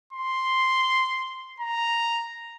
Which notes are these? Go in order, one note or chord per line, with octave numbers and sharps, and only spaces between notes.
C6
A#5